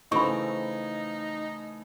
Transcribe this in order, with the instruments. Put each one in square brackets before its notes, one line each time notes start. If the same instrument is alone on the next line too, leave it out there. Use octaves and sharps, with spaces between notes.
[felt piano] C#3 E3 A3 [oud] C4 [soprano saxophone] D#4 [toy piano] B5 C#6